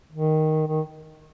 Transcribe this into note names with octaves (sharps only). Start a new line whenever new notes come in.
D#3
D#3